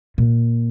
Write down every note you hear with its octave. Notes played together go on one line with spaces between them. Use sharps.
A#2